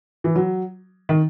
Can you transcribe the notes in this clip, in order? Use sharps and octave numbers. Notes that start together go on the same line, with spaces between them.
E3
F#3
D#3